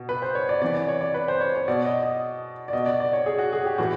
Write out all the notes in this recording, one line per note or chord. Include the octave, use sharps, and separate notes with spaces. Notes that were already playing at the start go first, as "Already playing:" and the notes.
Already playing: B2
B4
C5
C#5
D5
C3 E3 D5
D5
C#5
D5
B4
C5
C#5
C#5
B2 D5
D#5
D#5
D5
B2 D#5
D5
D5
C#5
G#4
F#4
G#4
G4
A2 E3 F#4